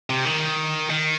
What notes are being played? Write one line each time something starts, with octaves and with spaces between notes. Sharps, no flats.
C3
D#3
D#3